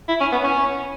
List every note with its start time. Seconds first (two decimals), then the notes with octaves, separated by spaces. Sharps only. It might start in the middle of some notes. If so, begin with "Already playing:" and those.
0.08 E4
0.21 C#4
0.32 B3
0.44 C#4